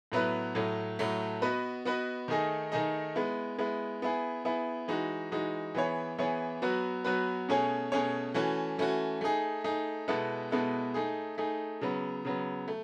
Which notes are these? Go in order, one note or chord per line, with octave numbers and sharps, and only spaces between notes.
A2 F#3 B3 E4 B4
A2 F#3 A3
A2 F#3 A3
B3 F#4 B4 D#5
B3 F#4 B4 D#5
D#3 A3 D#4 G#4 D#5
D#3 A3 D#4 G#4 D#5
G#3 B3 E4
G#3 B3 E4
B3 E4 G#4
B3 E4 G#4
E3 G#3 D#4 F#4
E3 G#3 D#4 F#4
E3 B3 E4 G#4 C#5
E3 B3 E4 G#4 C#5
F#3 B3 F#4 B4
F#3 B3 F#4 B4
B2 A3 C#4 G#4 C#5
B2 A3 C#4 G#4 C#5
E3 A3 C#4 F#4
E3 A3 C#4 F#4
A3 D#4 G#4
A3 D#4 G#4
B2 G#3 B3 E4 A4
B2 G#3 B3 E4 A4
A3 D#4 G#4
A3 D#4 G#4
C#3 F#3 B3
C#3 F#3 B3
A3